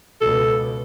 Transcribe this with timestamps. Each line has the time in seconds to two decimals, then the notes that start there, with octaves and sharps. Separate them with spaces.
0.21 C#2 B2 A4